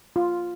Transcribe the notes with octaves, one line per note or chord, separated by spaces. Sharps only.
F4